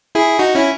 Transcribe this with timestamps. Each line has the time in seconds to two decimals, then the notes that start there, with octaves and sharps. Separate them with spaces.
0.15 E4 G#4
0.39 D#4 F#4
0.55 C#4 E4